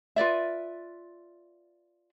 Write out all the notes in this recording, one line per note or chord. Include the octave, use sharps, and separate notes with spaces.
F4 B4 D5 E5